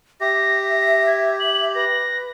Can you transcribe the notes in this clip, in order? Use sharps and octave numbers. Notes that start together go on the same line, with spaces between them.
G4 E5 A#6
G#6
F#7
B4 A#6